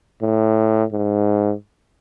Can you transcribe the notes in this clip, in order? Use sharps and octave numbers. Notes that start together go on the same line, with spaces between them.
A2
G#2